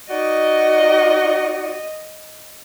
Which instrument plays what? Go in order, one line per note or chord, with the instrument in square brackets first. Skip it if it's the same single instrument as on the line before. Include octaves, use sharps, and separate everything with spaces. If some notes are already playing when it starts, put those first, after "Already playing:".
[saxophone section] D#4 F#4 D5 [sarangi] D#5